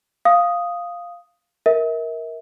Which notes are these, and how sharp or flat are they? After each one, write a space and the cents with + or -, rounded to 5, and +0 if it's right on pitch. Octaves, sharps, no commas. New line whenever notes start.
F5 +0 D#6 +0
A#4 +10 E5 -40